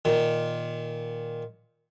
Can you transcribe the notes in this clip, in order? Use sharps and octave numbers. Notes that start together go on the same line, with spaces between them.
A#2 D#3